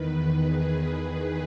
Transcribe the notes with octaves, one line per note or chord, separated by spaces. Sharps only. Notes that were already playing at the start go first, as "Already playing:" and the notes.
Already playing: E2 D#3 B4
G#4